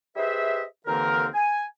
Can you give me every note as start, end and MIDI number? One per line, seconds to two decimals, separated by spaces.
0.17 0.64 67
0.17 0.64 68
0.17 0.64 71
0.17 0.64 72
0.17 0.64 75
0.17 0.64 76
0.87 1.27 39
0.87 1.27 50
0.87 1.27 52
0.87 1.27 58
0.87 1.27 60
0.87 1.27 70
1.35 1.64 80